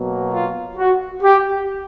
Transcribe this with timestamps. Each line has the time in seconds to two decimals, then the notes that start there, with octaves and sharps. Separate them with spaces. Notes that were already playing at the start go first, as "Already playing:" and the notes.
Already playing: B2 F#3 A#3
0.33 F4
0.78 F#4
1.23 G4